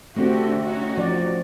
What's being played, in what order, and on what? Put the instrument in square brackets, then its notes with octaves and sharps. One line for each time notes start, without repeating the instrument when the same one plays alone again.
[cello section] D3 F#4 G4 [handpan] A3 C4
[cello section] C#4 D#4 F#4
[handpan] F3 D5